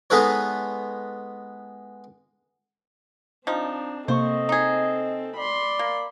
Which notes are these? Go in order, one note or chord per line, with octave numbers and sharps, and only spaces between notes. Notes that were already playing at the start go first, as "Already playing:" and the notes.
G#3 B3 D#4 A4 B4 C#5
F3 C4 D4 D#4
C3 A#3 C4 A4 C5 D#5 C#6
D#4 G#4
D5 B5 C6
A#3